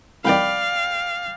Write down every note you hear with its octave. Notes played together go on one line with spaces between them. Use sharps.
C2 F2 D#3 D5 F5 G5 B5